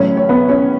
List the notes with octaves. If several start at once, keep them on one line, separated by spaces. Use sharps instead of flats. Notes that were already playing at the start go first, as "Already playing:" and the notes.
Already playing: A1 A2 F#3 C#4 C#5
C#5
B3 B4
C#4 C#5